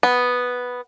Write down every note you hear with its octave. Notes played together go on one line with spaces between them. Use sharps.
B3